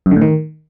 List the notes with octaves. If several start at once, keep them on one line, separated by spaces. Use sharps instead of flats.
F#2
D3
A2
D#3